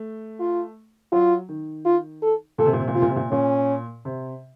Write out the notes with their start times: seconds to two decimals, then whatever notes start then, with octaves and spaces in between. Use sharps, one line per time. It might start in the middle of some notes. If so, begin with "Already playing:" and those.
Already playing: A3
0.40 F4
1.12 F#3 F4
1.49 D#3
1.85 F4
2.22 A4
2.58 A#2 A4
2.66 C3
2.73 A#2
2.80 C3
2.88 A#2
2.94 C3 F4
3.02 A#2
3.10 C3
3.16 A#2
3.32 A#2 C#4
4.05 C3